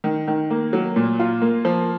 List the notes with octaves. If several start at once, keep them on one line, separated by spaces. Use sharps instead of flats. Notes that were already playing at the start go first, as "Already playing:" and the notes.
D#3
D#3
A#3
F#3
A#2
F4
A#3
F3